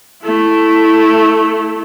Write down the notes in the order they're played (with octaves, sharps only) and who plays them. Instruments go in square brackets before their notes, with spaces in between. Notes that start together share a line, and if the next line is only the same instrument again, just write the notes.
[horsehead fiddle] A3 E4